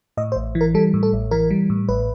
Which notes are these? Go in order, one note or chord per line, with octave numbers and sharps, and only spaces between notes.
A2 D#5
C5
A1
E3
A#4
G3 A4
A2
A4
A1
E3 A#4
G3
A2
A1 B4